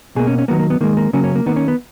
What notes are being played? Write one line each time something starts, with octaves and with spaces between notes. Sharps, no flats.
B2 A#3 G#4
C#4
C#4
D#3 F#3 A#3 B3
A#3
B3
D#3 G#3 A#3
A#3
C#3 F#3 A#3 C#4
C#4
A#3
D#3 A#3 B3
C#4
B3